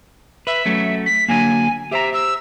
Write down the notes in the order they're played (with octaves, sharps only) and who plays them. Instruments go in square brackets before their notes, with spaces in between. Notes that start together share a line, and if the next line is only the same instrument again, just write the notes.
[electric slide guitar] B4 [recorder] E5
[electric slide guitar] F#3 A3 C#4
[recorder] B6
[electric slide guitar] D3 F#3 A#3 [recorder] G#5
[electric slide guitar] G4 C5 A#5 [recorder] E5
[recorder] E6